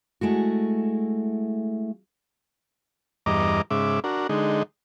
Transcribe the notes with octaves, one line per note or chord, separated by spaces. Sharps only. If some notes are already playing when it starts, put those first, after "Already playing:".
G#3 A3 E4 F#4
E2 G2 D#5 A#5 D6
G#2 C#3 E5 D6
D4 F#4 A#4
D3 G#3 D#4